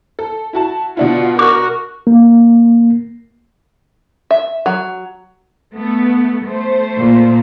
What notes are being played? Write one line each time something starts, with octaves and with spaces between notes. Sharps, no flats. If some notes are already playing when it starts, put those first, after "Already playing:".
A4
E4 F#4 A5
B2 D4 E4 F4 F#5
F#4 A#4 D6
A#3
E5
F#3
A3 B3
A3 C5
A#2